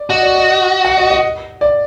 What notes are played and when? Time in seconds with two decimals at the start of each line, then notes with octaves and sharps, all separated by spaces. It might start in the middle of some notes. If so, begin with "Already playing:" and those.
Already playing: D5
0.10 F#4 D#5
0.22 D5
0.34 D#5
0.47 D#5
0.85 F#5
0.97 D#5
1.10 D#5
1.61 D5